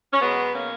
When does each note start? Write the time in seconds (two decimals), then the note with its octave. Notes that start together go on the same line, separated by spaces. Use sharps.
0.12 C#4
0.20 B2 F#3 G#3 B3
0.54 A#3 C#4